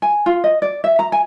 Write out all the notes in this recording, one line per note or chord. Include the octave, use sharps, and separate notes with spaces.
G#5
F4
D#5
D5
E5
A#5
G#5